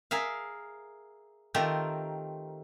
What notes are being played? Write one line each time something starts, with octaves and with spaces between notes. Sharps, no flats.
G#4 A#4 E5 F5
D#3 A3 C4 F4 G4 A#4